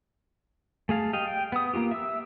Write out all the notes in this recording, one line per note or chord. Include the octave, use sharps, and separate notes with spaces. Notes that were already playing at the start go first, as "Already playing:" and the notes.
A3 G#4 F5 A5
G4 D#5 F5
G5
B3 D#6
A#3 D4 F4 G4
E5 E6